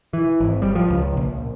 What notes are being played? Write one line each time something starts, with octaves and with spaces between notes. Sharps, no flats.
E3
G#1
G3
F3
C#2
A#1